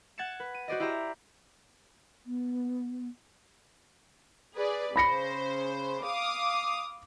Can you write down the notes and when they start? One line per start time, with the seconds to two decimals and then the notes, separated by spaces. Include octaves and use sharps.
0.18 F#5 G#6 A6 C#7 E7
0.40 B4
0.54 D#7
0.68 F#4 C5 D5 D#5
0.80 E4 G4 C5 E5 A#5
2.26 B3
4.55 G#4 B4 D5
4.96 C#3 C5 B5 A#6 C#7
6.03 F5 D6 D#6